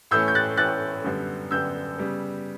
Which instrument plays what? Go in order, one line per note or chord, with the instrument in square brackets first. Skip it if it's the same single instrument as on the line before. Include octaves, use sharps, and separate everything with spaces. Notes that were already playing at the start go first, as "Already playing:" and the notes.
[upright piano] A2 E3 A3 C#4 E6 G6
G6
F#6 A6
A2 E3 A3 C#4 F#6 A6
F#2 D3 G3 B3
F#2 D3 G3 B3 E6 G6
C#3 G3 B3